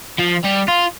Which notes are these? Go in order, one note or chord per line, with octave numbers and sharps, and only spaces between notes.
F3
G3
F4